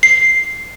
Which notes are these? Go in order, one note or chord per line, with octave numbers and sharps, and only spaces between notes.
C7